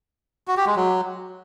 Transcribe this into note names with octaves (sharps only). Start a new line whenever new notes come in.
F#4
G4
G#3
F#3